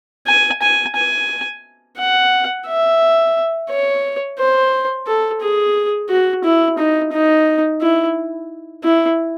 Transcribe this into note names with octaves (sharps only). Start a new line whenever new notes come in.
G#5
G#5
G#5
F#5
E5
C#5
C5
A4
G#4
F#4
E4
D#4
D#4
E4
E4